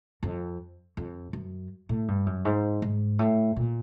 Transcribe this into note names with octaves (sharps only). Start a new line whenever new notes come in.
F2
F2
F#2
A2
G2
F#2
G#2
G#2
A2
A#2